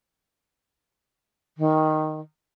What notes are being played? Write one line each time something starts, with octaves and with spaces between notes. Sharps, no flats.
D#3